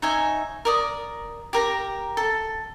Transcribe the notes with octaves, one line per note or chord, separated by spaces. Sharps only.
D#4 C#5 E5 G#5
A#4 D5 D#6
G4 A#4 A#5
A4